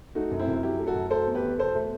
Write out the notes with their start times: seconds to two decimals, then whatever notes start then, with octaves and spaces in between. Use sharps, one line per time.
0.15 A3 D#4 F#4
0.31 F#2
0.39 C4 E4
0.48 F#2
0.63 F#3 E4 G4
0.79 A3
0.87 F#4 A4
0.95 F#2
1.10 A3 A4 C5
1.27 E2
1.35 G4 B4
1.43 E2
1.59 B2 A4 C5
1.75 A3